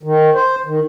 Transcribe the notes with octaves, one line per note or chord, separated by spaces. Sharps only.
D#3
C5
D#3